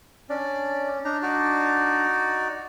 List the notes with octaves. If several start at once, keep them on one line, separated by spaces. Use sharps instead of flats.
C#4 D4 D5
D4 D#4 A#5
D#4 F#4 D5